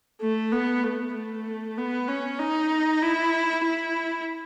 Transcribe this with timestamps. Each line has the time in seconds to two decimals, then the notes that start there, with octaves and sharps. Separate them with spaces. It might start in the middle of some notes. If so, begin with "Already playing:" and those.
0.21 A3
0.52 B3
0.83 A3
1.14 A3
1.77 B3
2.08 C#4
2.39 D#4
3.02 E4
3.65 E4